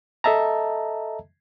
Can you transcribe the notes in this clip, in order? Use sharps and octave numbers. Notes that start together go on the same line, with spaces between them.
A4 D#5 E5 A5 A#5